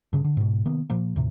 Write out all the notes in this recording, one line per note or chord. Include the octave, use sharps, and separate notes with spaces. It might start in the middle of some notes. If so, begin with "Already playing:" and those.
G2 C#3
D3
G#2 B2
C3 D#3 A#3 B3
A#2 F3 A#3
D#2 A2 C3